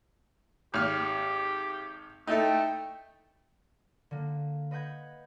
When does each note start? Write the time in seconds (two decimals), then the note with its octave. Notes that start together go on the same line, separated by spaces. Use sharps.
0.74 G#1 G4 F6
2.27 A3 D#4 E4 A4 G5
4.11 D3 A#3
4.71 B4 D#5 F#5 B5 G6 G#6